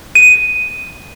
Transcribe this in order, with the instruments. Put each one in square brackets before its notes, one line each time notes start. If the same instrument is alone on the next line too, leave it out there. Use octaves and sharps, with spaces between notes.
[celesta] D#7